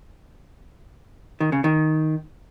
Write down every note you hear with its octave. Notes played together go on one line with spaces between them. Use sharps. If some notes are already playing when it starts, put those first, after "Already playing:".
D#3
C#3
D#3